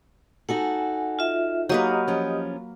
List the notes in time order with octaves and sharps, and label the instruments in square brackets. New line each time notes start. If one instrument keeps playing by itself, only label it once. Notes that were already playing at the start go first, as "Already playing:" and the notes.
[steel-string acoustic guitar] D#4 F#4 A4 [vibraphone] F#5 G#5
[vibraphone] F4 E5
[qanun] F#3 A#3 B4 [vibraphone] G4 D#5 D#6
[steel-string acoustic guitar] F3 C#4